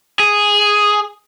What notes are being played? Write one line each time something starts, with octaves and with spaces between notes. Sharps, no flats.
G#4